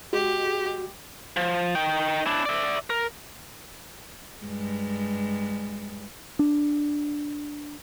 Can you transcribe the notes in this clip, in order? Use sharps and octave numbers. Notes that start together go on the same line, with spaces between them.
G#3 F#4 G4
F3
D#4 G5
D4 E4
D5 E5
A#4
G2 G#3
D4